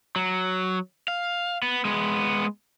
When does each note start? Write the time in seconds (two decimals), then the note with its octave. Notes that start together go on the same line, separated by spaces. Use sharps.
0.16 F#3
1.08 F5
1.62 B3
1.85 G#3 B3